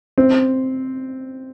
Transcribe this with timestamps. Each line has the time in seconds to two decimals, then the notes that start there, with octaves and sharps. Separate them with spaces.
0.18 C4